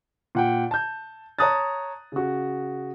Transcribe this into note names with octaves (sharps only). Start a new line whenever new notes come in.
A#2 F#5 G5
A5 G6
C#5 A5 A#5 D#6 F#6 A6
C#3 F#4